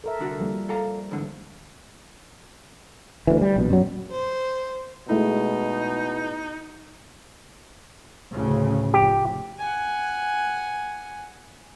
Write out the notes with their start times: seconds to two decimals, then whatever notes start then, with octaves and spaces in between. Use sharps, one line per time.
0.04 A4 A#4 E5
0.19 C2 D3 F#4
0.40 F3 G3 A#3
0.69 A4 F5 A#5
1.11 E2 G#2 D3
3.27 D2 E3
3.41 G3
3.56 A#1 B2
3.70 F#2 F#3
4.11 C5
5.09 B2 G#3 A3 D#4 E4
8.32 D2 A2 C#3
8.94 F1 G4
9.59 F#5 G#5